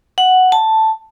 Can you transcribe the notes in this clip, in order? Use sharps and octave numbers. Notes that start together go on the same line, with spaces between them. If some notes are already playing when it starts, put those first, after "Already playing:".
F#5
A5